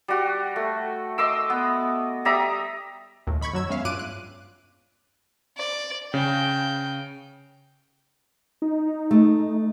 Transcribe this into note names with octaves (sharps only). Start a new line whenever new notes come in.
G3 F#4
A3
D#5 C6 D6 E6
B3
G3 E5 A#5 D#6
D#2 A2
D#3 B5 C#6 G#6
F#2 F#3 E6 G#6
G#3 B3 C#4 E5 F5
G2 F4 D6 F#6 D7 D#7
F#6
D5
C#3 G5
D#4
A3